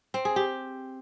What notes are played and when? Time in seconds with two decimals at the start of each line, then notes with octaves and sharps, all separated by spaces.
0.14 C4
0.25 G#4
0.36 G4